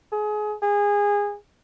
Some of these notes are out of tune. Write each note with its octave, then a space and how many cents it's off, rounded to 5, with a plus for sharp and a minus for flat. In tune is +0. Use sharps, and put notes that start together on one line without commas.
G#4 +25
G#4 -20